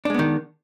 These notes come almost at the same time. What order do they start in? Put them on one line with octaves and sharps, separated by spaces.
D4 G#3 B3 D#3